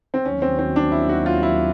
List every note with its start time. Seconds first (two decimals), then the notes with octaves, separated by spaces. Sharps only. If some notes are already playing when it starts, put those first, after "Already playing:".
0.14 C4
0.25 D#2 D#3 F#3 C#4
0.42 C4
0.59 C4
0.76 D4
0.92 E4
1.09 F#4
1.26 F4
1.43 E4